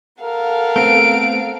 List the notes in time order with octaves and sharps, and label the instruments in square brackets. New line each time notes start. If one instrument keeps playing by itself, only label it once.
[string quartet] A4 F5 F#5 [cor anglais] A#4
[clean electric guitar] A3 B3 C4 [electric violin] D7